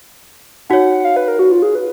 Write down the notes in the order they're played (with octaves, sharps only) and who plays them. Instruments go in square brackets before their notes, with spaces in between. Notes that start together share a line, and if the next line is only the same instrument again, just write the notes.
[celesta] D#4 F#4 C#5 [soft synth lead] F#5
[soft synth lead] F5
B4
A#4
F#4
F4
G#4
B4